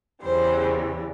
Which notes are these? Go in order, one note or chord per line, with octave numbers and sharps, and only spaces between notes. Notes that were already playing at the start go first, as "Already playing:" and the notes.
E2 C#3 E3 G3 C5